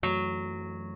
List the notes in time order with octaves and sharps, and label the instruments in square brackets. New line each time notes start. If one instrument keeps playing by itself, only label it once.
[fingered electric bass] F#2 E3 A3 [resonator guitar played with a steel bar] F#3